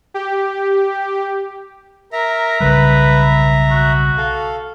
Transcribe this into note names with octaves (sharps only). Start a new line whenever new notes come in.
G4
A#4 E5 A#5
B1 C#3 G3 B4
F#4
A4 F5